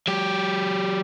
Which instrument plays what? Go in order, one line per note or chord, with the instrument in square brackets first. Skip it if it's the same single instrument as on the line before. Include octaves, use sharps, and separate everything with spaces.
[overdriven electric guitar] F#3 G4